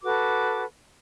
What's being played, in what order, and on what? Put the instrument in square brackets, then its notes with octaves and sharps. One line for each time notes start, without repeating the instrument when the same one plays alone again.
[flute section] F#4 A4 B4 D6